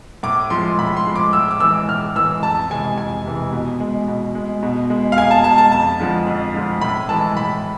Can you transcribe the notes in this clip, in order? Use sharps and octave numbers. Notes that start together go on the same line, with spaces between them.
A2 D6
F3 G#3 C6
A2 B5
C6
F3 G#3
D6
A2 E6
D6
E3 G#3 E6
A2 F6
E3 G#3 E6
F2 A5
C3 E3 G#3 G#5
F2 G#5
C3 E3 G#3
B2
G#3
B2
G#3
B2
G#3
F5
B2 G#5
A5
G#3 A5
A5
F2 A5
D3 F3 G#3
F2
D3 F3 G#3
A2 B5
E3 G#3 A5
A2 B5